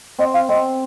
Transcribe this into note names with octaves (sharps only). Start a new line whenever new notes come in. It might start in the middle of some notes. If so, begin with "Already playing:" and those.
C4 D#5
F5
C4 D#5